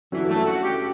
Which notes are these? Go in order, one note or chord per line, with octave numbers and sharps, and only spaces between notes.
G2 E3 F#3 C#4 F#4 A4
A3
F#4
G4